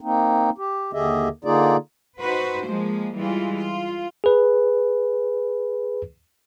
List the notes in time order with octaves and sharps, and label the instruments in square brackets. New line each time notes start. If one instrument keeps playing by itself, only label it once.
[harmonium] A#3 C4 D#4
G4
D#2 D3 G4 G#4 D#5 E5
D3 A#3 D#4 F4 G#4 D5
[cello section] D#4 F#4 B4 C5
F3 G#3 A#3
E3 G3 G#3 F4
F4
[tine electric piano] G#4 B4